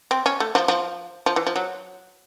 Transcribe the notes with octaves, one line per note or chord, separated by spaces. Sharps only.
C4
C#4
A3
F3
F3
F3
E3
F3
F#3